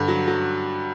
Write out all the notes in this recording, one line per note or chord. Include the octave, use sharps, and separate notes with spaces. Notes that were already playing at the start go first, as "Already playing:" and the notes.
Already playing: G2 D3
F#3
F#3